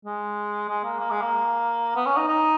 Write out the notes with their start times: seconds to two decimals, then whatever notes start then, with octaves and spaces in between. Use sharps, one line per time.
0.05 G#3
0.69 G#3
0.84 A#3
1.00 A#3
1.11 G#3
1.22 A#3
1.96 B3
2.06 C#4
2.17 D#4
2.28 D#4